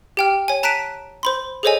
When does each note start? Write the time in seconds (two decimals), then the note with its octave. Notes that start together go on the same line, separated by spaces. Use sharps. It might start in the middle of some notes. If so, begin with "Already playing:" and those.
0.17 G4 G5 F6
0.48 C#5 G#5
0.63 A5 A#5 F#6 B6 D7 D#7
1.23 C5 B5 C6
1.63 G#4 A4 C5 C#5 D#5 G#5